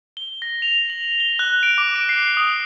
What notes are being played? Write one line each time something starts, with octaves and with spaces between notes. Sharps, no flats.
G7
A#6
F7
F#7
G7
F#6
D7
D6
D7
C7
D#6